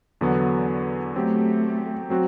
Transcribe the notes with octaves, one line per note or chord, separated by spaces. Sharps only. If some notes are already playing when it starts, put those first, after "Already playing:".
E2 D3 F#3 B3
F#3 A3 C4 G4
F#3 C4 F#4